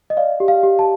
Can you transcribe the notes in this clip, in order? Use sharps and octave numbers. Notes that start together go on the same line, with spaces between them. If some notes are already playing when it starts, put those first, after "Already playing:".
D#5
D5 F5
G4
F5
G4
A5